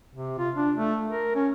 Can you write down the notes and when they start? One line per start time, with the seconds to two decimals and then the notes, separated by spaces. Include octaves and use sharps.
0.15 C3
0.38 F4
0.55 D4
0.76 A3
1.08 A#4
1.35 C#4